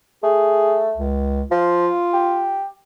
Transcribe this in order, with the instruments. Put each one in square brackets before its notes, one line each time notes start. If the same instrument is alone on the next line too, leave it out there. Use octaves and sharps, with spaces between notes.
[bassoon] A3 [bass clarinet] G#4
[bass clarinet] C#2
[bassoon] F3 [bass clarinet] F4
[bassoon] G4